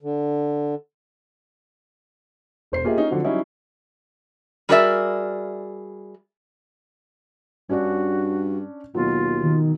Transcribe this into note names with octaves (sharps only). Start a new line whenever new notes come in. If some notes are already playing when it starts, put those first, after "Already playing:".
D3
E1 C5 C7
A#3 F4 G4 G#4 D#5 E5
C#4 D#4
D3 F3 F#3 C4
F#3 G3 C#4 D#4 E4
G3 F#4 G#4 A#4 D5 E5
G2 C#4 D4 F#4 D5
D#2 B2 F#3 F4
D#3